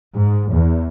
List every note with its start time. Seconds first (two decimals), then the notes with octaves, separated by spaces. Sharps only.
0.15 G#2
0.51 E2